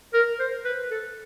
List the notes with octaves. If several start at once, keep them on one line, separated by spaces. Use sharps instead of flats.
A#4
C5
B4
A4